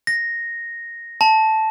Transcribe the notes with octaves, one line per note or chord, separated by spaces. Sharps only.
A#6
A5